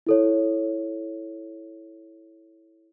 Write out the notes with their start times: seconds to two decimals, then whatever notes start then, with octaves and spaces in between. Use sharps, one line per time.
0.07 E4 A4 C#5